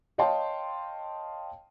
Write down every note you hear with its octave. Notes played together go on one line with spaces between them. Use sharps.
C#5 D#5 F5 G5 A5 C6